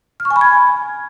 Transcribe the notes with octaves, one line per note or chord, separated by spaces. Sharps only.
F6
C#6
G#5
B5
G#6